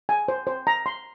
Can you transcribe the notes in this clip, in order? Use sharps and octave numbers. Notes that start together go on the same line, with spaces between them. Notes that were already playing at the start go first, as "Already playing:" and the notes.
G#5
C5
C5
A#5
C6